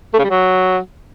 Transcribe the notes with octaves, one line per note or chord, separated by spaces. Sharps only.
A3
C#3
G3
F#3